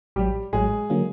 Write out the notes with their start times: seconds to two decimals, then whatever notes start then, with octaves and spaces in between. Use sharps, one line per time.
0.16 A1 A2 F#3 G3 G4
0.53 A1 A2 F#3 G#3 G#4
0.90 D3 F#3 A#3